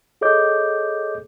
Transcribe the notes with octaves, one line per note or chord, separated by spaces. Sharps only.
G#4 A4 C#5 D#5 D6 G6